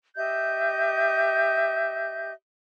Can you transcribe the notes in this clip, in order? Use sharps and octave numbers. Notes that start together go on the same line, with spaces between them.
G4 D#5 E5 G6